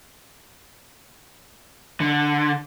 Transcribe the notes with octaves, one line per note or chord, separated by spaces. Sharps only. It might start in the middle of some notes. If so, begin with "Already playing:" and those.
D3